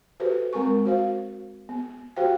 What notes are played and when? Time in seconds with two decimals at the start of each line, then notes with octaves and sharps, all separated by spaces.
0.20 F#4 G4 A4 B4 C5
0.53 G#3 C4 A#4 G#5 C#6
0.85 F#4 C5 F5
1.69 B3
2.16 F#4 G4 C5 F5 G5